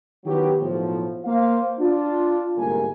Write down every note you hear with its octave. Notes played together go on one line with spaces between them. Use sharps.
D#3 F#3 B3 E4 G4
B1 A2 F3
A#3 C5 F5
D4 F4
G1 C2 G#2 A#3 A#4 G#5